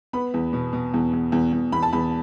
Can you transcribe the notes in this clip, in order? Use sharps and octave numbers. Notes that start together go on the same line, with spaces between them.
B3 B5
E2
B2
B2
E2
E2
E2
E2
E2 B5
A5
E2 B5